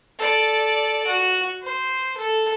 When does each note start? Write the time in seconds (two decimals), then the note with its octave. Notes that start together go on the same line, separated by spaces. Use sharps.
0.19 A4 D5
1.07 F#4
1.62 C5
2.17 A4